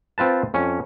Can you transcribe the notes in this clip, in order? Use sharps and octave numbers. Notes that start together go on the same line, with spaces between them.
C4 F4 B4 A5
F2 C#4